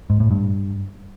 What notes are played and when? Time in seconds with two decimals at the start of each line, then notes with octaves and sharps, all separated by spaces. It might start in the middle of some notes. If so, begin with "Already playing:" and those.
0.10 G#2
0.20 A2
0.31 G2